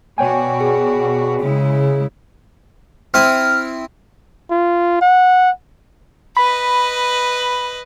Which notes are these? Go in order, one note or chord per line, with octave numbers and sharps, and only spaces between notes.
B2 F#4 C#5 D5 G5 G#5
G#4
C#3 G#3 E4
C4 E4 D#6 F6
F4
F#5
B4 D#5 B5